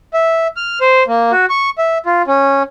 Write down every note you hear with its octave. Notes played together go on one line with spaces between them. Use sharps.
E5
F6
C5
A#3
F#4
C#6
E5
F4
C#4